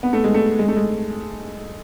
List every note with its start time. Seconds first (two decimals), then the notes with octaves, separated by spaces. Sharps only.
0.03 B3
0.13 A3
0.24 G#3
0.34 A3
0.59 G#3
0.68 A3
0.77 G#3